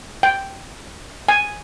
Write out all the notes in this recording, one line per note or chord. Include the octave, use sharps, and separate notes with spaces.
G5
G#5